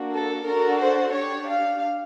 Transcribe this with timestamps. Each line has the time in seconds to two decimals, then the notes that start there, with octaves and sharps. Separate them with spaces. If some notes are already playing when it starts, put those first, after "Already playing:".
Already playing: A#3 D4 F#4
0.13 A4
0.47 D4 F#4 A4 A#4
0.80 C5
1.14 D4 G4 C#5
1.48 F5